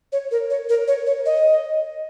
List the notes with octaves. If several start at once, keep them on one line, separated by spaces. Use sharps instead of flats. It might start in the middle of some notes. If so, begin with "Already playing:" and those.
C#5
A#4
C#5
A#4
C#5
C#5
D#5